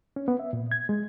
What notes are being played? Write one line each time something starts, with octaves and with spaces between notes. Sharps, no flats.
C#4
B3
E5
A#2
G#6
G#3